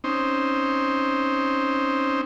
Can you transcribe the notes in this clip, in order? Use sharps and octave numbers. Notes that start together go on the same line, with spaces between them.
C4 C#4 D#4 C5